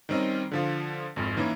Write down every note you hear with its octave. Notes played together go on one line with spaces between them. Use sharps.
D#3 G3 C4 C#4 D#5
D3 F3 F4
G#1 F2
D#3 E3 A#3 C#4 E4